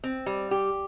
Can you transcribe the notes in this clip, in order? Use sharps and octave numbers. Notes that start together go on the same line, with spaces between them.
C4
G3
G4